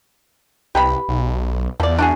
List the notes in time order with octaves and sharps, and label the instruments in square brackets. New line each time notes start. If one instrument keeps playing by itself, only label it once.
[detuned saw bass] C2 [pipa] G4 B4 B5
[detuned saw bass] B1
[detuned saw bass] E2 [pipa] F3 D5
[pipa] D4 F#4 G#4